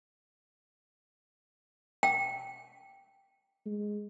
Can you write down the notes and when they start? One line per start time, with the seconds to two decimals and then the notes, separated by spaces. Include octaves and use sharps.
2.03 G5
3.66 G#3